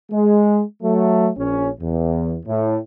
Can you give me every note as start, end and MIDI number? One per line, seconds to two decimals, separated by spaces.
0.11 0.62 56
0.83 1.29 54
0.83 1.29 57
1.37 1.69 34
1.37 1.69 61
1.81 2.38 40
2.46 2.78 45